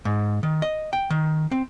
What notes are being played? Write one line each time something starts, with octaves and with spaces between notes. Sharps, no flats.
G#2
D#3
D#5
G5
D#3
C4